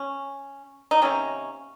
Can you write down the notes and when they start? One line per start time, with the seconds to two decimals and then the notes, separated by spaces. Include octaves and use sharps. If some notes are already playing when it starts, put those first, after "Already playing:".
Already playing: C#4
0.91 D#4
1.02 C3 D#3 A#3 C#4